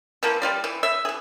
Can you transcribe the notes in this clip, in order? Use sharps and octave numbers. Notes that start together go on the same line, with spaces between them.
E3 F3 A#3
G3 F4 D5
E3
E5
E3 G#4